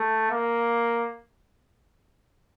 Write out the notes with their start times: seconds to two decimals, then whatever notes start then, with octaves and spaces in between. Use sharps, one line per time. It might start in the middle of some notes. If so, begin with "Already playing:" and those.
Already playing: A3
0.31 A#3